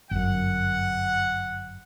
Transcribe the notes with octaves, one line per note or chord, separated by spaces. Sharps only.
G1 F#2 F#5